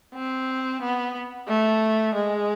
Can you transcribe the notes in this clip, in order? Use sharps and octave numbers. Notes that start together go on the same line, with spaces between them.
C4
B3
A3
G#3